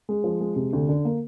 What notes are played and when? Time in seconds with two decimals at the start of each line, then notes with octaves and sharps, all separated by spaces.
0.09 G#3
0.24 F3
0.41 G#3
0.56 C3
0.73 D2
0.89 D3
1.05 A#3